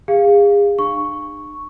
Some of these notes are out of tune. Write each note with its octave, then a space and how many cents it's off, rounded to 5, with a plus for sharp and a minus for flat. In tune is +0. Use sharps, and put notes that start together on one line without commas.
G#4 -35 F5 +0
D4 +45 C#6 +0